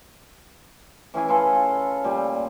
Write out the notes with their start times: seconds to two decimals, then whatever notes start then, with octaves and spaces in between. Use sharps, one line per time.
1.14 E3 C#4 G#4 G#5
1.28 E4 F4 A4 B4
1.53 F4 A4
2.04 A#2 G3